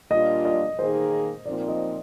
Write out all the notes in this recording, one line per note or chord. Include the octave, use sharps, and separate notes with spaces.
A#2 G3 D4 F4 D#5
D#5
D#3 A#3 D#4 G#4 C5
A#2 F3 C4 D#4 A#4 D5
D#5